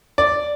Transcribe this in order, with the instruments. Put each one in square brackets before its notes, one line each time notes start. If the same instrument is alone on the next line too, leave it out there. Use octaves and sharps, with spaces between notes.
[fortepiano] D5